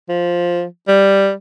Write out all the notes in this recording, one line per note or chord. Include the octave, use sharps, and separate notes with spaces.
F3
G3